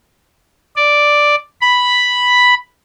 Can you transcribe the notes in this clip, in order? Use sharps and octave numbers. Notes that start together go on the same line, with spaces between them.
D5
B5